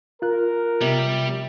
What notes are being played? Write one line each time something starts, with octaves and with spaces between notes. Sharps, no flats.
F4 A#4 F#6
C3 G3